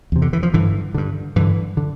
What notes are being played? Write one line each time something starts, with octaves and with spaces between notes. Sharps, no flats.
E2 C3
D3
E3
F3
G2 D3 E3
G2 D3
G2 D3 E3
D3